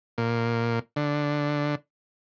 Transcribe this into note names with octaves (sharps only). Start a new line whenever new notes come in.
A#2
D3